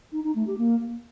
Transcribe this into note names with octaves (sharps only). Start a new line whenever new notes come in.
D#4
D#4
A3
G4
A#3